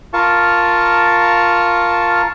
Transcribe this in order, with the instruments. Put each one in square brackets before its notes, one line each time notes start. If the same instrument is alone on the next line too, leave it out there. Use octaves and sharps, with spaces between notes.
[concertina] F4 A#4 F5 A5 C#6